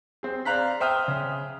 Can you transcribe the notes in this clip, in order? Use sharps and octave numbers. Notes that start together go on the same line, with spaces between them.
C4 G#4
C5 D5 F5 A#5 F#6 B6
C5 E5 G5 D#6 F6
C#3